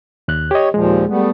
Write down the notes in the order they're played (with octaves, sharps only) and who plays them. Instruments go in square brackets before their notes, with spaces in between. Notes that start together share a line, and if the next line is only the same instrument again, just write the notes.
[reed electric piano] D#2 F#6
[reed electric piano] G4 D#5 [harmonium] C#5
[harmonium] D#2 A#2 F3 [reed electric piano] G#3
[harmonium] G3 A3 B3